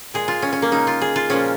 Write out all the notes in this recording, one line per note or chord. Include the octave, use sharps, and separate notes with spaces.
A#2 G#3 G#4
F4
C#4
C#4
A#3
C#3 G#3 D#4
F4
G#4
F4
A#2 F3 G#3 C#4